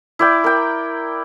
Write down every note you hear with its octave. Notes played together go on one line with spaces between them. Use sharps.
E4 D5 G5
A#4 G5